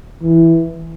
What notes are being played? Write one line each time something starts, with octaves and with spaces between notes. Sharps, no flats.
E3